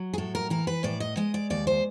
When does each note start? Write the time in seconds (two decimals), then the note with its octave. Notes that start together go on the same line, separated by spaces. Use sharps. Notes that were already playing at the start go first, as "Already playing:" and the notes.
Already playing: F#3
0.14 G#4
0.18 A2 A4
0.35 A#4
0.50 E3 A#4
0.67 B4
0.84 A2 D5
1.00 D#5
1.17 G#3 D#5
1.34 D5
1.50 D#2 D5
1.67 C5